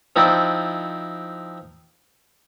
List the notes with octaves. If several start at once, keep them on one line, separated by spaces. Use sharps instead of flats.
F3 C4 D#4 E4 D5